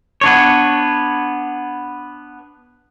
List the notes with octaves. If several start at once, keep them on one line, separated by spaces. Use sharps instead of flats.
B3 D4 C#5